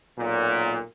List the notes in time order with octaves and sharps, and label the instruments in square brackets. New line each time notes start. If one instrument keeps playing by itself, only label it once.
[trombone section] B1 A#2